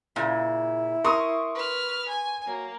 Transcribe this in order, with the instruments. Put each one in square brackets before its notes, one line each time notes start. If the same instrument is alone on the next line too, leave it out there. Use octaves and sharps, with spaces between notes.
[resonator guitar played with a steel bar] A#2 C#3 [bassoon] E4
[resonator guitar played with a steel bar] A#4 [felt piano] C6 C#6 D#6
[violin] B4 F6
G#5
[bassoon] F#3 [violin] A#3